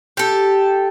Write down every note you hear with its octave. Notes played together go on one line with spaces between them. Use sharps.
G4 A4